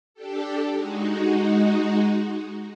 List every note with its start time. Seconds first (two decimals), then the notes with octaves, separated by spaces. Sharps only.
0.14 D4 G4 A4
0.71 G#3 D#4 F#4